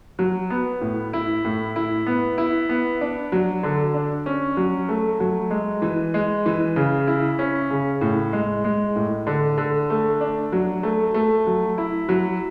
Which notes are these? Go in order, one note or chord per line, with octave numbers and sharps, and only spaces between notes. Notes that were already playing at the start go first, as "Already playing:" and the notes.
F#3
B3
A2
E4
A2
E4
B3
E4
B3
D4
F#3
D3
D4
C#4
F#3
A3
F#3
G#3
E3
G#3
E3
C#3
E4
C#4
C#3
A2
G#3
G#3
A2
D3
D3
A3
D4
F#3
A3
A3
F#3
E4
F#3